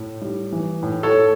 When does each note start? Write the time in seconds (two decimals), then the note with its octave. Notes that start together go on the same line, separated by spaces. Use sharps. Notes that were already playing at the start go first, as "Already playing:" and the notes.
Already playing: A2
0.22 G3
0.52 E3
0.83 A2
1.03 A4 C#5
1.13 A2